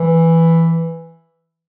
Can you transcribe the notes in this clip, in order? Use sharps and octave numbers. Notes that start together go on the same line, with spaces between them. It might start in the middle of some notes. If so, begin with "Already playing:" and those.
Already playing: E3